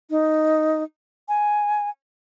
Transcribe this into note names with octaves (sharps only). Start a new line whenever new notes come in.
D#4
G#5